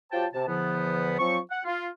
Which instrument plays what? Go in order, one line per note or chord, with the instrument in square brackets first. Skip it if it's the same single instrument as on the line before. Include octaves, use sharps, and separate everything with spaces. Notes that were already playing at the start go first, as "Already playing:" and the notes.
[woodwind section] F#3 F4 G4 C5 G5 A5
C3 A5
E2 D3 F3 B3
F3 F#3 C4 C#6
F#5
F4